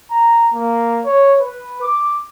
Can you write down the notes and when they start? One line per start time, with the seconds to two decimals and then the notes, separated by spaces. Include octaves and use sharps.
0.11 A#5
0.54 A#3
1.05 C#5
1.41 B4
1.82 D6